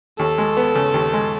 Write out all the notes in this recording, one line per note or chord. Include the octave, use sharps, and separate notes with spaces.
D#2 A4
G#3
B3
C#3
D#2
G#3